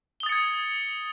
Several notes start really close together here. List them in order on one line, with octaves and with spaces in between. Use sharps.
G7 D#6 A6 C#7 G#6